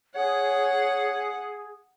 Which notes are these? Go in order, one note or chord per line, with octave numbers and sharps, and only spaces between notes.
G#4 C#5 F#5